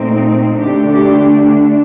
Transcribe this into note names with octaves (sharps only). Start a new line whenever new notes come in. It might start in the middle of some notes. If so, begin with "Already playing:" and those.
Already playing: A#2 A3 C4 D#4
D3 A3 D4 G4
G4